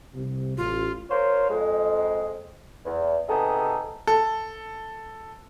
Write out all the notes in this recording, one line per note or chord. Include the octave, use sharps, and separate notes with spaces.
C2 C3
A1 F4
F4 A#4 C5 C#5
F2 G#3
E2
C3 B3 D#4 G#4 A4
A4